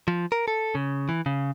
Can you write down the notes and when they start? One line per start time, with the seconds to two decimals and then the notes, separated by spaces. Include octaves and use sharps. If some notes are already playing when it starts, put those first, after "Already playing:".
0.08 F3
0.32 A#4
0.48 A4
0.75 C#3
1.09 E3
1.26 C#3